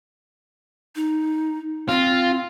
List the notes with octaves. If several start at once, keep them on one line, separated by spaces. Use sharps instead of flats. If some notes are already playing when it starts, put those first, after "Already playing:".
D#4
C4 F4